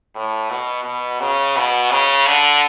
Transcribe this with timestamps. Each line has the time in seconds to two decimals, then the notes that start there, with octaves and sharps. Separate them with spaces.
0.15 A2
0.50 B2
0.85 B2
1.20 C#3
1.56 B2
1.91 C#3
2.27 D3